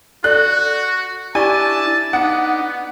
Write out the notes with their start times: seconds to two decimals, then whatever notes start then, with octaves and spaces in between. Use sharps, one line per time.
0.24 F#4 A4 D5 F#6
1.35 D4 E4 G4 D5 G#5 A5 C#6
2.13 B3 D4 D#4 F#5